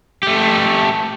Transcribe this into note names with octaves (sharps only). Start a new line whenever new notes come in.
A3 G4